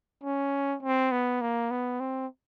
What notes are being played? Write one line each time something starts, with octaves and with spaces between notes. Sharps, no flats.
C#4
C4
B3
A#3
B3
C4